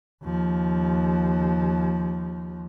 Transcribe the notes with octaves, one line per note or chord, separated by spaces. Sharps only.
D#2 F3